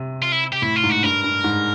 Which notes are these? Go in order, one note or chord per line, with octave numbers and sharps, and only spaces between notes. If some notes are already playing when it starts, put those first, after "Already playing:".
Already playing: C3
F4
E4
G4
A2 E4
F4
G#2
F#4
G2 A#4
G2
G#2